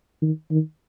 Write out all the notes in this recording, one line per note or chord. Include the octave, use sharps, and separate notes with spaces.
D#3
D#3